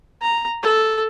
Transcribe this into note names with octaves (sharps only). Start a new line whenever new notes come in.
A#5
A4